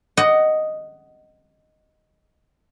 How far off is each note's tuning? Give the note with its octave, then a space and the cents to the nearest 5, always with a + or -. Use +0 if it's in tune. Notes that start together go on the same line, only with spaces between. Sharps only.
D#5 +0 F#5 +15